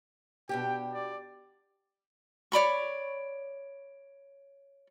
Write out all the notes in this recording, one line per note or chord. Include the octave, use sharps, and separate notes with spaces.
B2 D4 G4 G5
D5
C#5 D5 B5 C#6